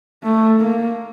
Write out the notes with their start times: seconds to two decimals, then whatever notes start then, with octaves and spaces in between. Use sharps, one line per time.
0.23 A3
0.61 A#3